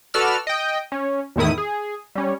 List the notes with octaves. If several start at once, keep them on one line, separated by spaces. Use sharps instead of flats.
F#4 A4 B4 D5 E6 F6
D#5 G5
C#4
E2 A2 D#3 E4 D#6
G#4
G3 C#4